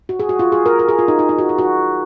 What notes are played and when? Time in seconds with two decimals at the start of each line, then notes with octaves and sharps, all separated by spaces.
0.09 F#4
0.20 G#4
0.29 F#4
0.39 F4
0.52 G#4
0.66 A#4
0.79 A#4
0.89 G#4
0.99 F4
1.08 D#4
1.19 D#4
1.29 D#4
1.38 F#4
1.49 G#4
1.58 F#4